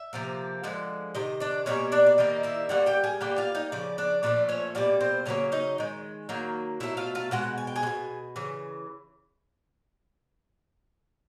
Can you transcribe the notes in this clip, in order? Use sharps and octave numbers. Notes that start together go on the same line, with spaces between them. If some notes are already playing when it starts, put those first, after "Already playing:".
Already playing: E5
C3 F3 A#3
D3 F3 G#3
C3 D#3 D#5
D4 D5
B2 G3 A#3 C#4 C#5
D4 D5
D5
D#3 G3 A#3 D#4 D#5
E4 E5
D3 G3 A#3 F#4 F#5
G4 G5
G#4 G#5
D3 G3 A#3 G4 G5
F4 F5
D#4 D#5
C#3 F3 D5
D4 D5
A#2 F3 A3 D4 D5
C#4 C#5
B2 G3 A#3 D5
C4 C5
C#3 F#3 A#3 C#4 C#5
D#4 D#5
D#3 G#3
D#3 F#3 A#3
B2 F#3 A3 E4 E5
F4 F5
F4 F5
B2 G#3 F#4 F#5
G#5
G5
G#4 G#5
G#3
B2
C#3 E3